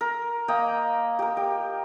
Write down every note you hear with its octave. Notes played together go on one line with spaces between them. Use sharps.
A#4
A#3 D#5 G5
G4 A#4
G4